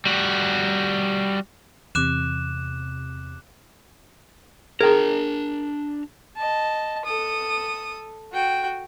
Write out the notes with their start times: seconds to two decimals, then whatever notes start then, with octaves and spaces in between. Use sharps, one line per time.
0.06 G3 F#4
1.95 E2 C3 D6 F#6 E7
4.81 D4 G#4 A#4 G5 A#5
6.37 D#5 A5
7.06 A4 D#6
8.33 F#4 G5